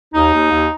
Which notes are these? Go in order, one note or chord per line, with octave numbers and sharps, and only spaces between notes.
D#2 D#4
D#2
D#2